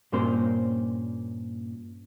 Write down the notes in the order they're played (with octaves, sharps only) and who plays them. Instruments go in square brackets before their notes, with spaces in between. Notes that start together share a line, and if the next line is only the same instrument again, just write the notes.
[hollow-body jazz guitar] G2 A#2 C#4 A#4 C5 C6